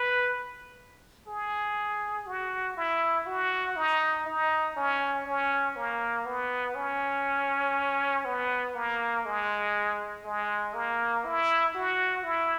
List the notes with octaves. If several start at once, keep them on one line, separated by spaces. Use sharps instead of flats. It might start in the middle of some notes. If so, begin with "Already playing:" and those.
Already playing: B4
G#4
F#4
E4
F#4
D#4
D#4
C#4
C#4
A#3
B3
C#4
B3
A#3
G#3
G#3
A#3
E4
F#4
E4